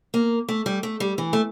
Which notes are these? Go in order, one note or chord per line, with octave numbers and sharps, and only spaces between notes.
A#3
A3
G3
A3
G3
E3
A3